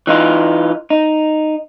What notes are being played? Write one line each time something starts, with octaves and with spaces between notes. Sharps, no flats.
E3 D#4 F4
D#4